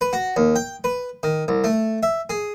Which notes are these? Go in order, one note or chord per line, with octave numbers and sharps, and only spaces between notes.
B4
F#4
D#2
G5
B4
D#3
C2
A3
E5
G#4